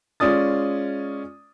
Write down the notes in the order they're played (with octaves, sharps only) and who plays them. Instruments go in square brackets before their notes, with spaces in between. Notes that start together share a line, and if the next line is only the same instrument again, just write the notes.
[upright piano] G#3 C#4 F4 D5 D#6 A6